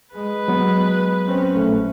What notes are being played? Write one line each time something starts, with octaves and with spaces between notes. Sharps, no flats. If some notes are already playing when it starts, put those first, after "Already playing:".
G#3 B4
F#3 B3
C4 C#4
A#1 A3